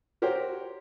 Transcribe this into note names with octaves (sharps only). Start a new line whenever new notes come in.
F#4 G4 A#4 C5 C#5